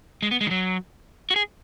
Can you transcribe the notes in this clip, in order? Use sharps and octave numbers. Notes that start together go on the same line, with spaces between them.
G#3
B3
G#3
D#3
F#3
F#4
G#4